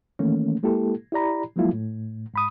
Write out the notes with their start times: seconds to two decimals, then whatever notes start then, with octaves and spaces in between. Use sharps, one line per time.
0.19 D#3 E3 A3 A#3 C#4
0.63 G#3 A#3 E4 G4 A4
1.12 E4 G4 D5 A#5 B5
1.56 F3 F#3 G#3 A#3 E4 F4
1.73 A2
2.34 G#2 B5 D#6